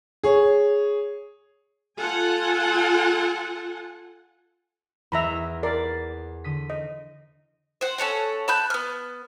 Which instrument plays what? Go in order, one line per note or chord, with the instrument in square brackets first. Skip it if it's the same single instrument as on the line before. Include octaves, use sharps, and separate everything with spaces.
[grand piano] G#4 C#5
[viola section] F4 A4 F#5 G#5
[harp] E2 [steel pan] E5 A#5 B5
[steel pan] A#4 D5 [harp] B5 C7
[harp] D3 D#6 B6
[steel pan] D#5
[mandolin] C5 F#5
C#4 A4 C#5 F#5
A5 B5 F#6 G6
B3 F6